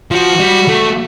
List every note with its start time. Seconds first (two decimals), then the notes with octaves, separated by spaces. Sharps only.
0.11 F3 F#4
0.40 G3
0.68 A3